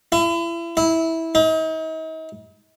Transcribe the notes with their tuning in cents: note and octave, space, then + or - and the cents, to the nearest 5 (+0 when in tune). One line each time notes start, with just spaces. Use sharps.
E4 +35
E4 -15
D#4 +40